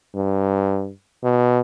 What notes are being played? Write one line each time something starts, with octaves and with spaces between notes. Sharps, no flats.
G2
B2